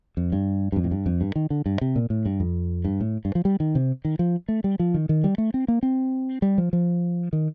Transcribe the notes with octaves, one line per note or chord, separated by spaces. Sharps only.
F2
G2
G2
F2
A2
G2
F2
G2
D#3
D3
G2
C3
A#2
A2
G2
F2
G2
A2
G2
F3
G3
D#3
C3
D#3
F3
A3
G3
F3
D#3
D#3
G3
A3
C4
A#3
C4
G3
F3
F3
D#3